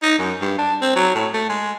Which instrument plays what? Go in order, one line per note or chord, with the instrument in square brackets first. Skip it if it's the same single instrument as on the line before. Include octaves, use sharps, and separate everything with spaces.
[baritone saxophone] D#4
F#2
G2
D4
C4
F#3
A2
A3
G#3